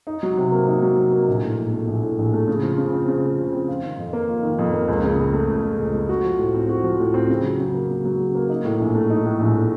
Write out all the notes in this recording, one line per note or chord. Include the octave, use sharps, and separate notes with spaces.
D#4
F#3
C3
A#3
D#4
F#3
C3
A#3
A#1
A2
A#1
A3
A#1
A2
A#1
A3
C#3
F3
C#3
C4
C#3
F3
C#3
C4
F4
D#3
F2
A#3
F4
D#3
F2
A#3
C#2
C#3
C#2
A3
C#2
C#3
C#2
A3
F#4
F3
A2
C4
F#4
F3
A2
C4
C#3
F#3
C#3
A#3
C#3
F#3
C#3
A#3
D#4
A2
A#1
A3
D#4
A2
A#1
A3